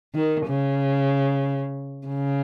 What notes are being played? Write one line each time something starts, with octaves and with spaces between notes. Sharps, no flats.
D#3
C#3
C#3